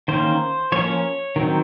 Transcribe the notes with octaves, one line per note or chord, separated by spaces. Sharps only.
D#3 A#3 C#4 C5
F3 A#3 C#4 C#5
D#3 F#3 C4